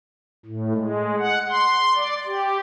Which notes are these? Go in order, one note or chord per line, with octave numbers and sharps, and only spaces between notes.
A2
G#3
F#5
C6
D5
G4